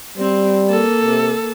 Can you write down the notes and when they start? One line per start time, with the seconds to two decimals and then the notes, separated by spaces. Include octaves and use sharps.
0.18 G3 C4
0.67 A#3 A4
1.02 C3